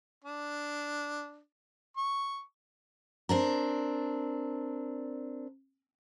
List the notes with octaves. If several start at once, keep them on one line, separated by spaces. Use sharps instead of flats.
D4
C#6
C4 D4 A#4